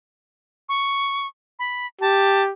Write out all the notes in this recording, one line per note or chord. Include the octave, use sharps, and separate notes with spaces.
C#6
B5
G4 A5